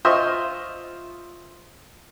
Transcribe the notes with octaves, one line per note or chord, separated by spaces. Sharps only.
F4 C5 D#5 E5 C#6